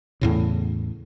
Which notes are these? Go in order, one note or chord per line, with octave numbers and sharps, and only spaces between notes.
E2 A2 C#3